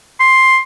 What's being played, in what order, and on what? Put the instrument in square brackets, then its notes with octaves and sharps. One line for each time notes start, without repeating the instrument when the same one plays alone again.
[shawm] C6